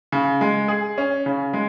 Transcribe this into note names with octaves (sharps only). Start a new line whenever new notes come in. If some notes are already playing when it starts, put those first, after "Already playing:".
C#3
G#3
G#4
C#4
C#3
G#3